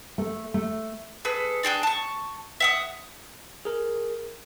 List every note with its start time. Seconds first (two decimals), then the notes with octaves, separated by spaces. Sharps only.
0.18 A3
0.54 A3
1.25 G#4 A4 B4
1.63 D4 G#4 G5 F#6
1.83 A5 C#6
2.60 E5 F#5 D#6
3.65 G#4 A#4